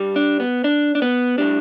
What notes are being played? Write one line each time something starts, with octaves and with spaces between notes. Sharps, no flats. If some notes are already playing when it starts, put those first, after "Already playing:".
Already playing: G2 G3
D4
B3
D4
D4
B3
A2 G3 D4